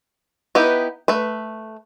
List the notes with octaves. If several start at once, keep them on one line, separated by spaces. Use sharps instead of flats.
B3 D#4 E4 G4 B4
A3 B4